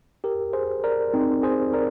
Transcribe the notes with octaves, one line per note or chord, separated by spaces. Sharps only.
G4 A#4
G#4 C5
A#4 D5
C4 D#4
G#4 C5
A#4 D5